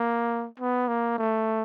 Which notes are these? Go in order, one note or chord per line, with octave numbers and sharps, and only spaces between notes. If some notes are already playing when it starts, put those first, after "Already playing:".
Already playing: A#3
B3
A#3
A3